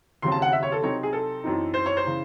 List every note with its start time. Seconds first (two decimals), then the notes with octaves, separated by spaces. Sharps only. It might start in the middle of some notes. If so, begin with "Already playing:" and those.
0.22 D#2 C#3 F#3 C4 C6
0.32 A5
0.42 F#5
0.53 E5
0.63 C#5
0.72 A4
0.82 C3 F#3 C4 D#4 C#5
1.03 G#4
1.13 A4
1.44 F#2 E3 C4 D#4
1.74 C5
1.86 C#5
1.97 C5
2.04 C#3 E3